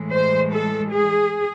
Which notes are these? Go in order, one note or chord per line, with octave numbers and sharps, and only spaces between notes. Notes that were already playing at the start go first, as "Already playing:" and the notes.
Already playing: A2 E3 G#3
C5
A4
G#4